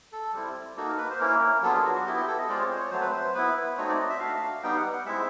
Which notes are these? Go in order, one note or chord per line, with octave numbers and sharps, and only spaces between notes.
A4
G3 C4 E4
A#3 D#4 F#4 A4
A#4
B4
C5
A#3 C#4 E4 A#4
F#3 B3 D4 F4 A4
G#4
F#4
F#4
B3 E4 G4
G4
A4
D#5
G#3 C4 F4 D5
C#5
C5
C#5
F#3 A3 C4 C5
B4
C5
B3 E4 B4
A3 C4 D#4 F#4 C#5
D5
D#5
E5
A3 D4 F#4 F5
G3 B3 D#4 G5
F#5
F#5
G#3 C4 E4 E5